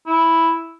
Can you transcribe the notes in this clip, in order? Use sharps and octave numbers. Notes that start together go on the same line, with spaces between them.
E4